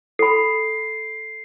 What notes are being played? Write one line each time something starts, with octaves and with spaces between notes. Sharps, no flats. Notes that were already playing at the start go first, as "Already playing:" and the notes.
A4 B5 C7